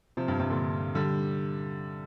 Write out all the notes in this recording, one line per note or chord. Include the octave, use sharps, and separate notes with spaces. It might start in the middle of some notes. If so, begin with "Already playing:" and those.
C3 F3
G2
G2 C3
A#2 D3
D3 G3